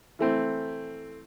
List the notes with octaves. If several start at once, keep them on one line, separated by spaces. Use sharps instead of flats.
E3 A3 C4